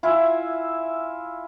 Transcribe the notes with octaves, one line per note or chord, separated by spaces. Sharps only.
E4 F4 E5 G#5